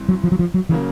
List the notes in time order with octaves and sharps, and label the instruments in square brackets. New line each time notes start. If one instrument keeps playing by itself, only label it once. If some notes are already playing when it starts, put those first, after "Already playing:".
Already playing: [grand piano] G2 E3 C4
[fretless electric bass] F#3
F3
F#3
F3
F#3
[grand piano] C#3 F#3 A#3 [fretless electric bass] E3